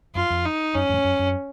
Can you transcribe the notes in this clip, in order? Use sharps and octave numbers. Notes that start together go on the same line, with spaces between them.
F#2 F4
F2
D#4
F#2 C#4
F2 A2
F#2
F#2